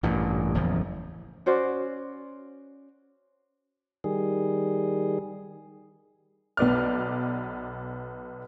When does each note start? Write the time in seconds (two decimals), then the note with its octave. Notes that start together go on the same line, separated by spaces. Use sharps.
0.03 A1 G2 A#2
0.54 F#1 E2 A2 F3
1.46 C#4 F#4 C5 D5
4.04 D#3 G3 G#4
6.57 B1 B3 D5 F6